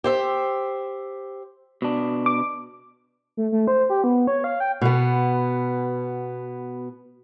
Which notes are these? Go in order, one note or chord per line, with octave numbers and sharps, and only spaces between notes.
G4 C5 E5
B2 D4
D6
A3
A3
C5
G4
B3
C#5
F5
G5
B2 B3